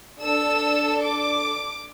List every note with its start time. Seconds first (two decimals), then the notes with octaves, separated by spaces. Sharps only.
0.20 D4 A4 E6
1.01 D6